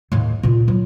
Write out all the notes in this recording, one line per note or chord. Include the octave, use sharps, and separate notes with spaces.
D#2 A2
A#2 F4
F#3